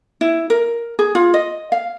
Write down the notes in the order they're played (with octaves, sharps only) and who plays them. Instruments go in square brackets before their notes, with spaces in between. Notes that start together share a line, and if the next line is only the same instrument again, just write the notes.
[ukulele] E4
A#4
G#4
F4
D#5
F5